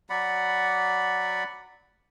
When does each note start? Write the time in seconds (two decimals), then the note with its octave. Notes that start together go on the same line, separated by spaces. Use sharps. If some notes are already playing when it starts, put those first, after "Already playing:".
0.10 F#3 D5 F#5 B5